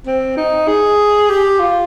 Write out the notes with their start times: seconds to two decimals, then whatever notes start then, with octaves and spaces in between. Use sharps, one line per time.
0.06 C4
0.37 D#4
0.67 G#4
1.29 G4
1.59 F4